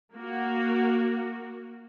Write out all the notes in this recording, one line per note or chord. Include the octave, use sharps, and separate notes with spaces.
A#3 F#4